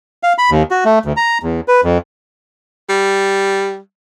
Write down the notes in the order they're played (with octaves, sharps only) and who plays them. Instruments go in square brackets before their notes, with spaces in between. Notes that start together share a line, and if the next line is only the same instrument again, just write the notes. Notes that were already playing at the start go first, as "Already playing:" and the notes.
[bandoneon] F5
B5
D#2
F#4
A3
D2
A#5
E2
B4
F2
[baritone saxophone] G3